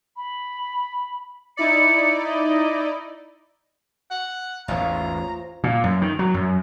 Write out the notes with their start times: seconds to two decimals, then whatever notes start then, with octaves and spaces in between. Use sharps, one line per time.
0.16 B5
1.57 D#4 E4 D5 C#7
2.24 D#5
4.11 F#5
4.68 A1 E2 G#2 F4 C5 C#5 A#5
5.64 A#2
5.84 F#2
6.02 D#3
6.19 F#3
6.34 F#2